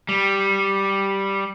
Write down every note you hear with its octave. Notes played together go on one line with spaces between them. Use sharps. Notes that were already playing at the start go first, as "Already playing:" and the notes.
G3